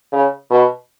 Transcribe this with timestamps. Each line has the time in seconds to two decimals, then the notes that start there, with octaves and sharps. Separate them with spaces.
0.13 C#3
0.50 B2